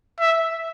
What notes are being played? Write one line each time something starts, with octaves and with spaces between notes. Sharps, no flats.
E5